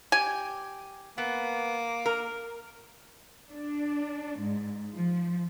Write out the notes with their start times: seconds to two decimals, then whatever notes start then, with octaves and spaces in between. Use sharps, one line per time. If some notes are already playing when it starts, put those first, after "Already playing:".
0.12 G4 G#5
1.18 A#3 B3
2.06 A#4
3.51 D4
4.39 G#2
4.93 F3